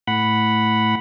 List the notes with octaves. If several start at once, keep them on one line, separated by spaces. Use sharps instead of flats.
A2 F#5 B5